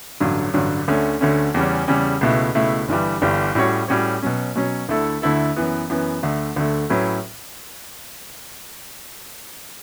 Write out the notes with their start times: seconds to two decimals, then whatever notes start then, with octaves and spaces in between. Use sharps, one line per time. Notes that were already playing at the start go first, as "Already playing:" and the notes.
0.20 A1 G2 D3 F#3
0.54 A1 G2 D3 F#3
0.88 D2 D3 A3 C#4
1.21 D2 D3 A3 C#4
1.54 E2 C#3 G3 C#4
1.88 E2 C#3 G3 C#4
2.21 C#2 B2 A3 E4
2.55 C#2 B2 A3 E4
2.88 G1 G2 E3 G3
3.21 G1 G2 E3 G3
3.55 A2 G3 C#4 F#4 C#5
3.88 A2 G3 C#4 F#4 C#5
4.23 B2 F#3 C#4
4.55 B2 F#3 C#4
4.89 D2 D3 A3 E4 A4
5.22 D2 D3 A3 E4 A4
5.56 F#2 E3 B3
5.90 F#2 E3 B3
6.23 D2 D3 A3
6.56 D2 D3 A3
6.90 A2 F#3 C#4 E4 B4